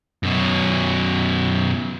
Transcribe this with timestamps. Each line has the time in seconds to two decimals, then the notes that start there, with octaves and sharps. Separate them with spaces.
0.23 F#2 B2